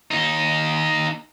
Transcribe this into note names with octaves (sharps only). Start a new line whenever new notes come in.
D#2 D#4